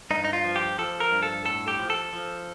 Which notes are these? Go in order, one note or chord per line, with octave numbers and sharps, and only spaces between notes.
G2 D#4
D#4
F4
F3
G4
F3 A4
A#4
G2
A4
A2 A4
G4
F3
A4
F3